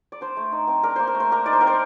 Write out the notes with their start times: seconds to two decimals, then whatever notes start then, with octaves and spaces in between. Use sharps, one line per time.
0.12 D5
0.21 D4 C5
0.37 A3
0.52 D#4
0.67 C4
0.83 D4 A#4
0.96 A#3 C5
1.07 A#4
1.14 A3
1.20 C5
1.31 D4 A#4
1.46 D#4 D5
1.53 C5
1.61 C4 A#4
1.67 C5